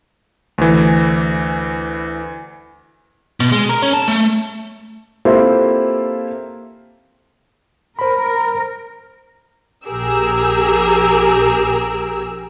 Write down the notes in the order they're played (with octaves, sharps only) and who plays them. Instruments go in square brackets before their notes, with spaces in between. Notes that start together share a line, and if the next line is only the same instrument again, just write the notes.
[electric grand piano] D2 E3
[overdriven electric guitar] B2
G#3
A#4
C#4
A5
A3
[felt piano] A#3 C4 E4 F4 G4 A4
[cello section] A#4 [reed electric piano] C5 B5
[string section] A#1 G4 G#4 A#4 E6